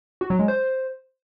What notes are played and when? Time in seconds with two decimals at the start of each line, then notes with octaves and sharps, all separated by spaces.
0.21 F#4
0.30 F#3
0.39 G#3
0.48 C5